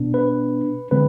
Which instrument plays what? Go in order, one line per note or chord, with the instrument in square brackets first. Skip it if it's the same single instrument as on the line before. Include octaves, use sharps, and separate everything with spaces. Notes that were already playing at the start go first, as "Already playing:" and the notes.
Already playing: [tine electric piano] B2 B3 D4
B4
D3 G#3 C4 B4